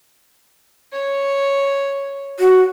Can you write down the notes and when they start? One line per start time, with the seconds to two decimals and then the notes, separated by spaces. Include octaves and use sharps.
0.92 C#5
2.39 F#4